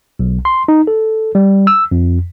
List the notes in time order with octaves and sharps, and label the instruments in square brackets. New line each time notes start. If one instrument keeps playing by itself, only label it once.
[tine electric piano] B1
C6
D#4
A4
G3
E6
F2